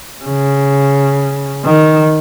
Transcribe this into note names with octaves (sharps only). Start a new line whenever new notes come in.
C#3
D#3